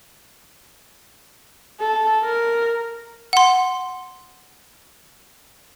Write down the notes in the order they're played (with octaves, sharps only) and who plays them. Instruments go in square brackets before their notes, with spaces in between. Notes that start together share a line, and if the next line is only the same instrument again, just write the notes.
[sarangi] A4
A#4
[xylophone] F#5 C6